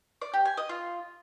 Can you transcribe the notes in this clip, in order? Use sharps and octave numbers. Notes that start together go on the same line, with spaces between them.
D5
G4
G#5
D#5
F4